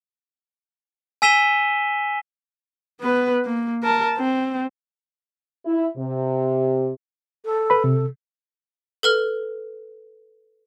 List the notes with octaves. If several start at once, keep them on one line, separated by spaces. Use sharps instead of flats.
G#5 E6 B6 D#7 E7 G7
B3 B4
A#3
A#4 A5
C4
E4
C3
A4
B4 B5
C3
A4 B4 F6